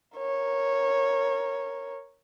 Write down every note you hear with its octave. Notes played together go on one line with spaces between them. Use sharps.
A#4 C#5